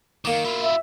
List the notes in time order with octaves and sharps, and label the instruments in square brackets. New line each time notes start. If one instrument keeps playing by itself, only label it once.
[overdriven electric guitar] D#3 [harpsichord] A#3 D6
[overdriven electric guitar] E4 F4
[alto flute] E5